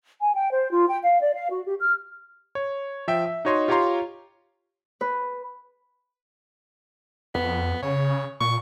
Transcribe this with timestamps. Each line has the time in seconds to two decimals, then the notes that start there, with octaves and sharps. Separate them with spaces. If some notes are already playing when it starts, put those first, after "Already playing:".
0.22 G#5
0.35 G5
0.53 C5
0.71 F4
0.90 G5
1.03 F5
1.21 D5
1.35 F5
1.51 F#4
1.66 G4
1.81 F6
2.55 C#5
3.08 F3 E5 G5
3.26 E5
3.45 D#4 F#4 C#5 D#5 C6
3.68 F4 G4 C#5 F5 A#5 C6
5.01 B4
7.35 F2 B3
7.83 C#3 C#5
8.41 A#2 C#6